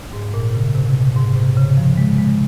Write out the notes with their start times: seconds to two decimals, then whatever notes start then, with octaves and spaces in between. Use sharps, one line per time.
0.13 G#2
0.34 A#2
0.54 C#3
0.75 C3
0.88 C3
0.95 A#2
1.16 G#2
1.36 C3
1.57 C#3
1.77 F3
1.98 G#3
2.18 G#3